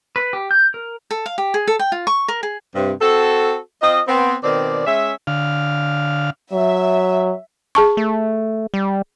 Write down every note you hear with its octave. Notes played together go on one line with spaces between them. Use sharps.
B4
G4
G6
A#4
A4
F5
G4
G#4
A4
G5
F4
C#6
A#4
G#4
G2 C3
C4 F#4 A4
C4 F4 D#5
B3 C4
B2 D#3 C4 D5
G#3 C#4 E5
D3 F5
F#3 E5
G#4 A5 C#6
A3
G3